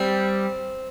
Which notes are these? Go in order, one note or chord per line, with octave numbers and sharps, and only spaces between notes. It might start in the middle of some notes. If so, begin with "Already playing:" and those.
Already playing: G3 C4